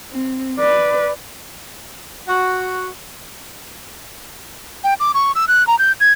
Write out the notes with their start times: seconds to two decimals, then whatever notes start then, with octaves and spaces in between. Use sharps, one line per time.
0.11 C4
0.59 B4 D5
2.28 F#4
4.84 G5
5.00 D6
5.14 C#6
5.35 E6
5.48 F#6
5.67 A#5
5.79 G6
6.00 G#6